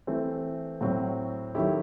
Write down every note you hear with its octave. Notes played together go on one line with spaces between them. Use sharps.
E3 A3 C4
A2 F#3 C4 F#4
D#3 F#3 A3 E4 G4